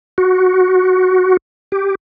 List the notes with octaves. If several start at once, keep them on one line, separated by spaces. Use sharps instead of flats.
F#4
G4